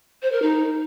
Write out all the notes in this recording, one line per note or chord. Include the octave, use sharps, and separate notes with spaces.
C5
A#4
D#4